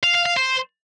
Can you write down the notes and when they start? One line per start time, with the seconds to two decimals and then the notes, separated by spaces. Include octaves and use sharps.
0.04 F5
0.15 F5
0.26 F5
0.37 C5